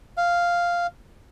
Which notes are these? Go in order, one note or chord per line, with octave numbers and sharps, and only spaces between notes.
F5